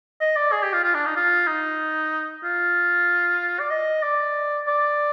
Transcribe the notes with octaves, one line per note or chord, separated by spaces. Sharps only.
D#5
D5
G#4
G4
F4
F4
D4
D#4
F4
D#4
F4
D5
D#5
D5
D5